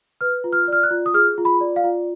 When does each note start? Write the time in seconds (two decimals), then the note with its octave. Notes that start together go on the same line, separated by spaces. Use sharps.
0.21 B4 F6
0.44 F4
0.53 F6
0.68 D5 F6
0.83 F#6
0.91 F4
1.06 D#6
1.14 G#4 F6
1.38 F4
1.45 B5
1.61 D5
1.76 F5
1.84 F4